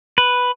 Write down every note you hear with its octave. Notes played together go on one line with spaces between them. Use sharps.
B4